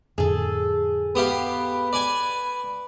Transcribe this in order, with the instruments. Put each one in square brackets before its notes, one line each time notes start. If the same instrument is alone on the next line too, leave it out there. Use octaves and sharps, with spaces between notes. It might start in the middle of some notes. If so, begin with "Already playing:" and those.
[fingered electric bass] F2 A2 D3 [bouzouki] G#4 A4
[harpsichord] B3 G4 F5 [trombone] B4
[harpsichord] D5 G#5